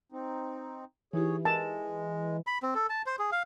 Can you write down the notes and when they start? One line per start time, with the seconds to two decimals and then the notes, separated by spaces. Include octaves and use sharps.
0.12 C4 D#4
1.13 E3 D#4 E4 G4 G#4 C#5
1.45 G#3 A#4 A5
2.47 B5
2.63 C4
2.75 A4
2.89 A5
3.06 C5
3.19 G#4
3.32 F5